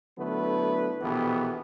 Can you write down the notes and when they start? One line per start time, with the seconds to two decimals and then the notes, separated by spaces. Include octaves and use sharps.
0.17 D3 F#3 A3 B3 E4 B4
1.01 A#1 B2 E3 B3 G4 A4